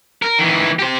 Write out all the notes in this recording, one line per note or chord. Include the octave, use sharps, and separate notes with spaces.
A#4
D#3 E3
G4 C5